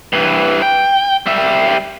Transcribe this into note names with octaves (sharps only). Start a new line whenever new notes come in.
G2 E3
G5
G3 E5